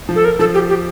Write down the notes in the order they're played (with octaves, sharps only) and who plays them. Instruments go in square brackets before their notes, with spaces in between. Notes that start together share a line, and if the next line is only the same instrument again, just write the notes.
[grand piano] F3
[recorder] A4
A#4
[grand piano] F3 [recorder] A4
[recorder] G4
G4